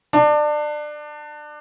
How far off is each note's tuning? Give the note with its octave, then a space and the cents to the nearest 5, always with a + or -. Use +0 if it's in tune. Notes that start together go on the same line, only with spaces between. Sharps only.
D4 +25